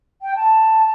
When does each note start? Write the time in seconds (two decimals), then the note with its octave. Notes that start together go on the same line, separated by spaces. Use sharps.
0.21 G5
0.35 A5